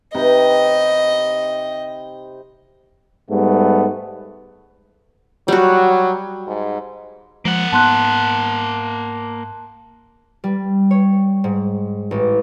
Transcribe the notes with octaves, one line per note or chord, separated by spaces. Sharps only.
C3 D#4 B4 D#5
G#2 G3 A3 B3
F#3 G3 F#4
G#2
F3 G#3 A#3 F#5
G#2 B3 A5 C6 F#6
G3
C#5
G#2
A1